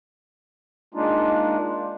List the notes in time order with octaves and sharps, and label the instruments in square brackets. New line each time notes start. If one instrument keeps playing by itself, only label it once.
[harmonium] G#3 A#3 D4 D#4 F4